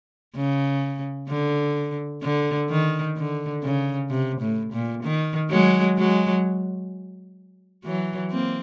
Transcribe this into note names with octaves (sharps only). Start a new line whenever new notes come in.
C#3
D3
D3
D#3
D3
C#3
C3
A2
A#2
D#3
F#3 G#3
F#3 G#3
E3 F#3
A#3 C4